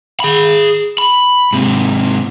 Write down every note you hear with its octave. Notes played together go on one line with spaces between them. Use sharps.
G#4 B5
B5
G#2 C3